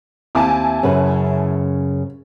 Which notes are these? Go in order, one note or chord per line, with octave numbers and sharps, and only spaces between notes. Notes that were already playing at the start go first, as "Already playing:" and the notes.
D#2 C4 E4 G#5 A5 D6
F#2 C#3 B4 C#5